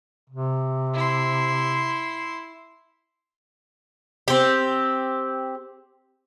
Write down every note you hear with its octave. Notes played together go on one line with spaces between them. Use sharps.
C3
E4 C6
C4 G4